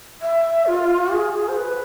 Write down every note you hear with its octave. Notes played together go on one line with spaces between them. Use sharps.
E5
F4
G#4
C5
B4